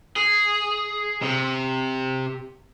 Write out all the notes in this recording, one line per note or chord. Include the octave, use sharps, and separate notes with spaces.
G#4
C3